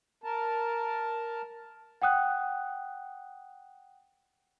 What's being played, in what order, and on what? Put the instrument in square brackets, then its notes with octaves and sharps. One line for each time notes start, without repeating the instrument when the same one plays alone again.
[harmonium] A#4 A5
[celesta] F#5 G5 D#6 F#6